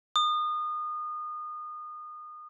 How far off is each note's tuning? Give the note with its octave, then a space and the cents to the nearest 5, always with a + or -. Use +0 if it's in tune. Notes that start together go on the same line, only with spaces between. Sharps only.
D#6 -30